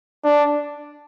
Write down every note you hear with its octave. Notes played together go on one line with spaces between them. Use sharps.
D4